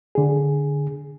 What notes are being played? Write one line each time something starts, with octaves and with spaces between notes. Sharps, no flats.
D3 G#4